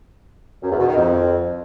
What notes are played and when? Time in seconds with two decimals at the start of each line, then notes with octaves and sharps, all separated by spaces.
0.62 F#2
0.70 E2
0.79 B2
0.88 D#3
0.96 F2